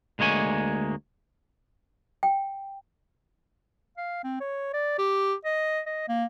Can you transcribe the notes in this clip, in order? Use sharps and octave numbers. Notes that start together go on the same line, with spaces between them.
D2 G#3 A#3 C#5 G#5
G5
F5
C4
C#5
D5
G4
D#5
D#5
A#3